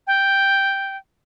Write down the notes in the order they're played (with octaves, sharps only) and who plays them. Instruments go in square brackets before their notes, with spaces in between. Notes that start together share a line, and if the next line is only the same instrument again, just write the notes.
[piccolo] G5